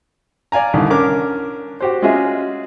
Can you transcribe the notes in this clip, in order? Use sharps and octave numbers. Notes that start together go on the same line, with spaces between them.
D5 F5 G#5 A#5
C2 D3 D#3
C#4 D4 A#4 D6
F#4 G4 C5
G#3 C#4 F4 F#4 G#4 E5